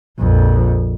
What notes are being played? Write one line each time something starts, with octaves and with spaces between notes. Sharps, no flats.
A#1 F2